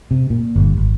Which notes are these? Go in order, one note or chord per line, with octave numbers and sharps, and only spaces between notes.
C3
A#2
G1
G#1